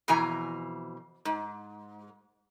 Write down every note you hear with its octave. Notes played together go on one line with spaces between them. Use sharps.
F2 B2 E3 G#5 A#5
G#2